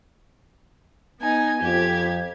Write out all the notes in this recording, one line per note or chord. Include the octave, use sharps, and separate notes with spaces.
B3 D#4 G#5
F2 G4 G#6